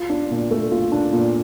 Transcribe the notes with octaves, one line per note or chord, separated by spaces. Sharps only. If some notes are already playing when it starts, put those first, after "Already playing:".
Already playing: F4
D4
A#2
A3
F4
D4
A#2